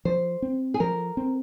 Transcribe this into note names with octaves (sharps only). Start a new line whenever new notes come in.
F3 C5
C4
G#4
F3 A#4
C4